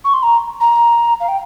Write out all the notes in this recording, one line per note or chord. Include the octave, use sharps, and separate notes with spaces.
C#6
C6
A#5
A#5
F5
G5